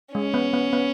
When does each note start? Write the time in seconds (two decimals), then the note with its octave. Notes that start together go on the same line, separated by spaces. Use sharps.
0.14 G#3 C#4
0.34 B3
0.53 B3
0.73 B3